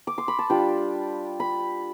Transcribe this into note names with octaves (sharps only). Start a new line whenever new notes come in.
D6
C6
B5
A5
G3 D4 F4 G5
B5